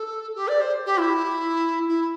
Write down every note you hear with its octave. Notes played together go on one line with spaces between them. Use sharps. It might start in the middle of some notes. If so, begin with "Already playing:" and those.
Already playing: A4
G4
D5
C5
G4
E4
E4